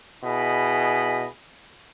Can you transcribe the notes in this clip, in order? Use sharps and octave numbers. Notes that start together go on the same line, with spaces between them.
B2 E4 G#4 D#5 B5